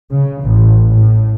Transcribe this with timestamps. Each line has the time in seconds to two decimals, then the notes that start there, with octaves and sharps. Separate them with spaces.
0.10 C#3
0.43 A1
0.88 A2